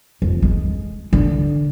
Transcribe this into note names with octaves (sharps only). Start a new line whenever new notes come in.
F2
G#3
D3